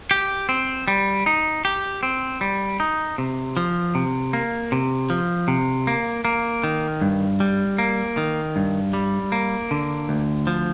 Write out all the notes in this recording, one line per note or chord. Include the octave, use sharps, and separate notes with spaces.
G4
C4
G3
D#4
G4
C4
G3
D#4
C3
F3
C3
A#3
C3
F3
C3
A#3
A#3
D#3
G2
G3
A#3
D#3
G2
G3
A#3
D3
D2
F3